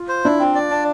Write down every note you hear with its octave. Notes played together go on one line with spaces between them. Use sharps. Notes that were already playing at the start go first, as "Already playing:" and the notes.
Already playing: F4
C5
D4 E4
C4
D5
D4